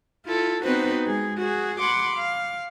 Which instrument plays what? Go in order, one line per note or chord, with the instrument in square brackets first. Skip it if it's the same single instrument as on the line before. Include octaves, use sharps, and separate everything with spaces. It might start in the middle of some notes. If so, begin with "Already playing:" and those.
[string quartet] E4 F4 A4
B3 C4 D#4 F#4 B4 C5
G#3 G#4
F#4 G#4
F#5 B5 C6 D6
F5